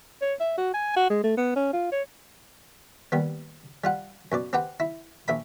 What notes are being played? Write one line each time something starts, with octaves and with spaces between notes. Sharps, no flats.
C#5
E5
F#4
G#5
F#4
G#3
A3
B3
C#4
F4
C#5
D#2 G3 B3
G3 F4 F#5
F#2 B2 D5
C4 G4 B4 F#5 G5
E4
A#1 E5 B5